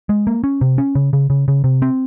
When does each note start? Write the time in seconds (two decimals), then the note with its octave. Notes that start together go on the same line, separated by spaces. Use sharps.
0.09 G#3
0.27 A#3
0.44 C#4
0.61 C3
0.78 C#4
0.95 C#3
1.13 C#3
1.30 C#3
1.48 C#3
1.64 C3
1.82 C4